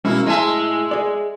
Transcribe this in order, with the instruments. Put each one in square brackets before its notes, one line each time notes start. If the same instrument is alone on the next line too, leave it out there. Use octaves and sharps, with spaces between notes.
[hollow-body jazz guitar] B2 G#3 C#4 [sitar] A#3 E4
[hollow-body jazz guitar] A2 G#5 A5 [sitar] G#3 E5
[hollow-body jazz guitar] G#4 D5